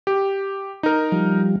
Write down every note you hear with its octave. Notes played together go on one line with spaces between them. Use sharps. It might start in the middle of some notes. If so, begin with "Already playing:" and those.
G4
D#4 A#4
F3 G3